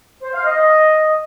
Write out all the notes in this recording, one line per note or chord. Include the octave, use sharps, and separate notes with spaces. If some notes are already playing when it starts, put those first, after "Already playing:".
C5
F5
D#5